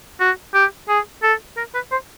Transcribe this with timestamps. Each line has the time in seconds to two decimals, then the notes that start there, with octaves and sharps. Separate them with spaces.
0.20 F#4
0.54 G4
0.89 G#4
1.23 A4
1.57 A#4
1.75 B4
1.92 C5